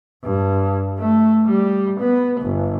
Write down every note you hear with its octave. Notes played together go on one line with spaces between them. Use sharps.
G2
A3
G3
B3
G1